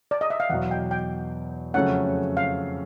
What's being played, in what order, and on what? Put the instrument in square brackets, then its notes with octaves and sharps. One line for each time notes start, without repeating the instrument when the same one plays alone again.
[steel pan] D5
D#5
E5
F5
[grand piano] E2 B2 F#3 [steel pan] F#5
[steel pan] G5
G5
[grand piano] F2 C#3 F#3 A3 C#4 [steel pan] F#5
[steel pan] F5